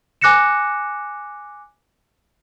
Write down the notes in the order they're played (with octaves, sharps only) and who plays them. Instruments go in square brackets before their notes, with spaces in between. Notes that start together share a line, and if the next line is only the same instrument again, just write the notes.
[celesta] G#5 D6 F#6 A#6 C#7 E7